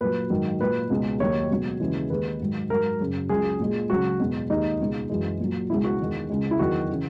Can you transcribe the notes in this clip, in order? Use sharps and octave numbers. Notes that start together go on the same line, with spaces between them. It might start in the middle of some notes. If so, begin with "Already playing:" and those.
A#2 F#3 B4
G#2 D#3 F#3
A#2 G#3 B4
C#2 B2 G#3
D#2 D#3 F#3 C#5
C#2 B2 F#3
D#2 C#3 E3 G#3
D#2 D#3 G#3 B4
G#2 D#3 F#3
G#2 F#3 A#4
F#2 C#3 F#3
C#2 C#3 F#3 G#4
A#2 G#3
C#2 C#3 F#3 F#4
E2 B2 G#3
D#2 D#3 G#3 D#4
C#2 B2 G#3
F#2 E3 G#3
A#2 F#3
C#2 B2 G#3 E4
F#4
E2 D#3 G#3
C#2 C#3 G#3
E4
E2 D#3 F#3 F#4
C#3 E3